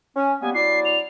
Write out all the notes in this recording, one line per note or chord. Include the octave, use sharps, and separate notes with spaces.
C#4
G3 A#3 B3 G#5
F#3 E4 D5 C7
F7